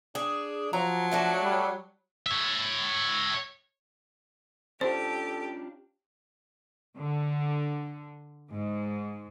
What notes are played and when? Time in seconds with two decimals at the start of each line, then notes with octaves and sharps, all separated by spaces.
0.15 D4 G#4
0.73 F3 F#3 A#5
1.12 A3 D4 F#4
1.43 G3
2.26 C#5 E5
4.81 C#4 D4 F4 G4 A4 C5
6.96 D3
8.51 G#2